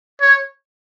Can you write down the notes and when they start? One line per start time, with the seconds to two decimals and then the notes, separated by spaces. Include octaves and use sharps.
0.21 C#5